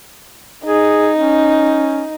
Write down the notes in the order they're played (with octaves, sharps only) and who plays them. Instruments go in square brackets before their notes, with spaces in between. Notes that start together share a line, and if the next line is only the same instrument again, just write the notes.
[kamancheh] D#4 [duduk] G#4
[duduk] C#4